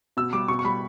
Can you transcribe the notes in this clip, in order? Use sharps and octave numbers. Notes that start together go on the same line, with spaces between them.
B2 E6
G3 D6
B2 C#6
C#6
G3 B5